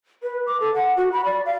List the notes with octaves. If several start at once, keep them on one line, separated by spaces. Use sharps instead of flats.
B4
D6
A4
F#5
F#4
B5
D5
F5